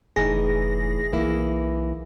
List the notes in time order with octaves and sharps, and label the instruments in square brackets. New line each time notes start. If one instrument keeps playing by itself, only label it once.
[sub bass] F1 [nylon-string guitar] A2 E3 D#4 [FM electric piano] G#4 A#6
[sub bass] B1 [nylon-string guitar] E3 A#3 E4